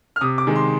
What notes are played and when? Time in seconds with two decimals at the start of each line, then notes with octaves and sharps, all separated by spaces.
0.16 F6
0.21 C3 D#6
0.38 D6
0.47 D#3 G#3
0.56 C6